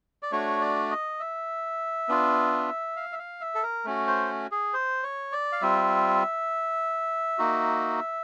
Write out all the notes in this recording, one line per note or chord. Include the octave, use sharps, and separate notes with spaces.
D5
A3 D4 F#4 C#5
D5
D#5
E5
B3 D4 F4
F5
E5
F5
E5
A4
A#4
A3 C#4 F#4
C5
G#4
C5
C#5
D5
F5
G3 C4 F4 E5
A#3 D#4 F#4